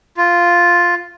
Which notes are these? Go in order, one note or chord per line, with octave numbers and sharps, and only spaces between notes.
F4